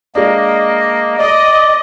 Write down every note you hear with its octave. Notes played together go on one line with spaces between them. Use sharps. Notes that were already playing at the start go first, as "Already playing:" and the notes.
G#3 A#3 D4 D#5
D5 D#5